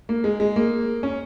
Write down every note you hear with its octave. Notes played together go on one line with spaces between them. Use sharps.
A#3
G#3
G#3
A#3
C#4